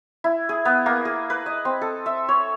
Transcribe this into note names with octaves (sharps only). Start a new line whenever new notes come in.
E4
G#4
B3
A#3
G#4
B4
D#5
C4
A4
E5
C#5